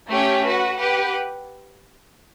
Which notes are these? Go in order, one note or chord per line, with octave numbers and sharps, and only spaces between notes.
A3 C#4 G4 C#5 G5
F#4 B4 F#5
G4 B4 F#5